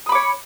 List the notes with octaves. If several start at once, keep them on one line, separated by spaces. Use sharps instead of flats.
C#5 B5 D6 D#6